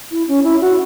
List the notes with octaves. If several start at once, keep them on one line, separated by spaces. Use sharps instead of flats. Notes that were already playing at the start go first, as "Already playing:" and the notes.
E4
C#4
E4
F#4